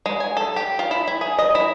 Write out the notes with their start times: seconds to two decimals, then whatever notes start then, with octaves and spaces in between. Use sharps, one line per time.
0.06 G#3
0.20 G#5
0.37 A4
0.56 G4
0.79 F4
0.91 E4
1.07 E4
1.21 G#4
1.38 D#5
1.55 E4